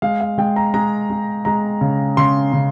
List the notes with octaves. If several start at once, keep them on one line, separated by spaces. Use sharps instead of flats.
G#3 F5
F5
G#3 G5
A#5
G#3 A#5
G#3
G#3 A#5
C#3
C#3 C6
C#3